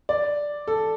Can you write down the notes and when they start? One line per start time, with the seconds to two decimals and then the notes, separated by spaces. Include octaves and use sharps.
0.09 D5
0.67 A4